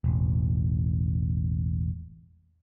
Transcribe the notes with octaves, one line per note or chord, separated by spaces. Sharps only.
E1 A1